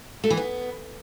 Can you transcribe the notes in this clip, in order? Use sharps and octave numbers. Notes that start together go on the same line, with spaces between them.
A3
E3
B3